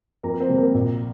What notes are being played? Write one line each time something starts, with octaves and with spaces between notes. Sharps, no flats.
F2 A#4 A#5
A#4
C4 C5
C3 G3
A#3 A#4
A#1